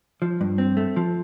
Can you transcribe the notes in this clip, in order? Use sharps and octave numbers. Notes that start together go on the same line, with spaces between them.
F3
G2
C4
A3
F3